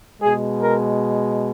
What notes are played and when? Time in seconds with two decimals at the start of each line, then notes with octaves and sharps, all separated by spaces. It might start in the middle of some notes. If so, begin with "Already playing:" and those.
0.22 B2 G#3 G#4
0.62 A#4